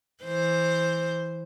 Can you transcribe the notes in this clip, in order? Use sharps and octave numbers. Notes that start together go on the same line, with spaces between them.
E3 C5